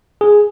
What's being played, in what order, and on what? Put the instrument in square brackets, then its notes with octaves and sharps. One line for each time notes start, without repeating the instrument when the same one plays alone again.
[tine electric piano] G#4